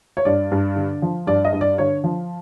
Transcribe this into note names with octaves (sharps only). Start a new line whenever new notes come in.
C#5
G2 D5
G2
D3
F3
G2 D5
D#5
G2
D5
D3 C#5
F3